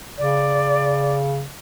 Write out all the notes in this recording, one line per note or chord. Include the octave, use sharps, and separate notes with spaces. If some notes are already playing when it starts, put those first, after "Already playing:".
C#3 D5